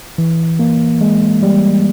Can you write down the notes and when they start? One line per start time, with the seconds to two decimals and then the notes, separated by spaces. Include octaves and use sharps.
0.18 E3
0.59 A#3
1.01 G#3
1.43 G3